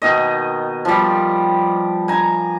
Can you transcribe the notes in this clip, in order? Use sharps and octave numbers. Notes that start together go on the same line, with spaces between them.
B2 D#3 D#5
F3 G3
G#5 A#5